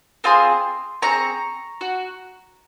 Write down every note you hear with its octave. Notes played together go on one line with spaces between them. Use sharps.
C4 F4 G#4 C6 D#6
C4 F4 G#4 A#5 C#6
F#4